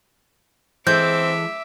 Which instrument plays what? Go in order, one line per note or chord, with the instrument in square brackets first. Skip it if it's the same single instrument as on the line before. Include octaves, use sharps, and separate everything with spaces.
[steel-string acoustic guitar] E3 G#3 A4 [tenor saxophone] C4 [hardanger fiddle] E5 D6 [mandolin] G6